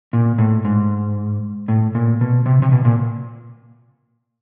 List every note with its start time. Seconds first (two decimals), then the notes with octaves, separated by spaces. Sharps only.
0.13 A#2
0.38 A2
0.65 G#2
1.68 A2
1.95 A#2
2.21 B2
2.46 C3
2.62 C3
2.72 B2
2.85 A#2